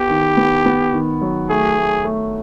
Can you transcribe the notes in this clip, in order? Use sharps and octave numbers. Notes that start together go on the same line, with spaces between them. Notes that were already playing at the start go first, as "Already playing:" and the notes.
Already playing: B3 G4
D#3
B3
B3
D#3
F#3
A3 G#4
A3
A3